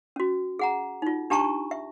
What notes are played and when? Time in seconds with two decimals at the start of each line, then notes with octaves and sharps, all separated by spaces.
0.16 C#4 F#4
0.59 G#4 F#5 A#5
1.02 D#4 F4
1.30 D4 G4 A5 A#5 C#6
1.71 E5